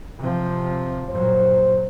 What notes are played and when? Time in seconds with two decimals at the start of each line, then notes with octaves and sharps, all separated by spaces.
0.19 C3 F3
1.10 G2 A#2 F#3 C5